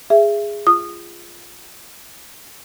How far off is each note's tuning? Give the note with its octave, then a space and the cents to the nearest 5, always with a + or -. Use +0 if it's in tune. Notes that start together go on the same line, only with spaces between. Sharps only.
G#4 -10 E5 +25
F4 -20 D#6 -20